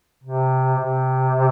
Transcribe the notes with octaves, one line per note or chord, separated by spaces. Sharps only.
C3
C3